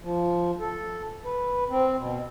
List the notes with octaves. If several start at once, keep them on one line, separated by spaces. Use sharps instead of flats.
F3
A4
B4
C4
B2